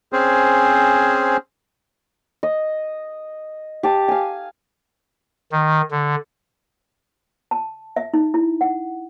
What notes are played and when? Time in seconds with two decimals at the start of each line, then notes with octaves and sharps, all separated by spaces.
0.13 C4 C#4 G#4 C5
2.43 D#5
3.83 G4 A5
4.08 F5 G#5
5.52 D#3
5.91 D3
7.51 A5
7.96 E5
8.14 D#4
8.34 E4
8.61 F#5